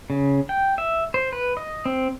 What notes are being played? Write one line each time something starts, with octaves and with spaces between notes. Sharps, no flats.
C#3
G5
E5
C5
B4
D#5
C4